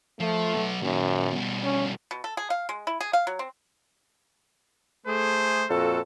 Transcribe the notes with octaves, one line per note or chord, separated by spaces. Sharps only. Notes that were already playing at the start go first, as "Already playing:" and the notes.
F3 A3
F#3 B3
F#2 A#2 D#3
B2 G3
C#4
B2
A4
G#4
F5
G#3
E4
G#4
F5
F#3
C4
A3 G#4 C5
F2 A#2 F#4 A4